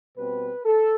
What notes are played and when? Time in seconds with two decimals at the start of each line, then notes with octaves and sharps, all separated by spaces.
0.17 B2 G3 C4 B4
0.66 A4